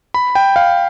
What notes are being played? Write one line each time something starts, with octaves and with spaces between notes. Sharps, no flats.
B5
G5
F5